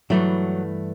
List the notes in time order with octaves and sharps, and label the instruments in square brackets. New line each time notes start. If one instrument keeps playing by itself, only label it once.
[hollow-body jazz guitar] G2 E3 A3 E4 [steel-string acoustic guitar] F#3